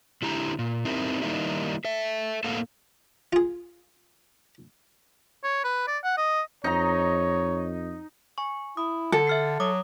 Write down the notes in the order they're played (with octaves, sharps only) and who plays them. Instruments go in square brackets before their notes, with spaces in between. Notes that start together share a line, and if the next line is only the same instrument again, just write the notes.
[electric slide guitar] D3 E4 G4 A#5
A#2
C4 D#4 E4 G4 A#4
D#3 G3 A#3 D#4 E4
A4 E5
A2 A#3 A4 A#4 F5 F#5
[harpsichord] F4 G#4
[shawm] C#5
B4
D5
F#5
D#5
[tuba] F2 [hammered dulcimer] D#4 A#5 [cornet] C#5
[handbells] G#5 C#6
[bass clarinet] E4 [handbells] D#6
[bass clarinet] D3 [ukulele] A4
[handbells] E5 F6 C7
[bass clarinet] F#3 [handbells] D6 D#6